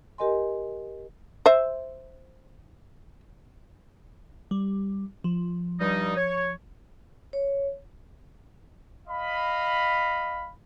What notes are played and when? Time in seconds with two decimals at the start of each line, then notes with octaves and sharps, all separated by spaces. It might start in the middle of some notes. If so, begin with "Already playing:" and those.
0.18 G4 A#4 D#5 G#5 C6
1.46 C5 E5
4.51 G3
5.24 F3
5.80 G2 G3 D#4
6.16 C#5
7.33 C#5
9.08 D#5 F5 B5